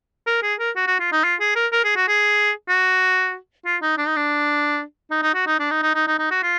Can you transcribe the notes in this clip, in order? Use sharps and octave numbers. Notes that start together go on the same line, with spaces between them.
A#4
G#4
A#4
F#4
F#4
F4
D#4
F4
G#4
A#4
A#4
G#4
F#4
G#4
F#4
F4
D#4
D4
D#4
D4
D#4
D#4
F#4
D#4
D4
D#4
D#4
D#4
D#4
D#4
F#4
F4